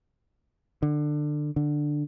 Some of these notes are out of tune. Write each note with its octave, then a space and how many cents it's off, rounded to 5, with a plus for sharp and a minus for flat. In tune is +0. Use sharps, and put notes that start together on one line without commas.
D3 +20
D3 +10